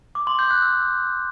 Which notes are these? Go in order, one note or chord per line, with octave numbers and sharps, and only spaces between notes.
D6
C6
G6
F#6
E6